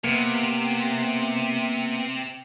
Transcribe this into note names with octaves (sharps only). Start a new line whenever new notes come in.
C3 A#3 B3